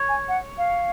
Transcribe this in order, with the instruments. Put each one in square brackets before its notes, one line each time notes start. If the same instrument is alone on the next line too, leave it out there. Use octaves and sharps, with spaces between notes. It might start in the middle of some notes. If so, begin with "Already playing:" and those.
Already playing: [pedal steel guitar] C#5
[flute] G#5
F#5
F5